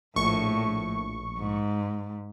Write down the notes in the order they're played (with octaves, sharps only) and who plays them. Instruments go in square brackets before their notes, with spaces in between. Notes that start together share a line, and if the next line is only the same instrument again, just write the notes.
[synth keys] A#1 C#6 [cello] A2
[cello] G#2